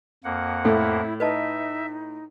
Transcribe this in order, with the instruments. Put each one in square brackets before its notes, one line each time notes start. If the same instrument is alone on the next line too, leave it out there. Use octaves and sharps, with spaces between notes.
[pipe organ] F2 A#3 F#5
[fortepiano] A2 [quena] E4 [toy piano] A4
[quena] D#4 [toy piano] B4 D#5 A5 [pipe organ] E5